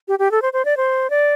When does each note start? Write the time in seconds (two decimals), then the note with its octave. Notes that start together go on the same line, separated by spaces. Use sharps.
0.08 G4
0.19 G4
0.31 A4
0.42 C5
0.53 C5
0.65 D5
0.77 C5
1.10 D5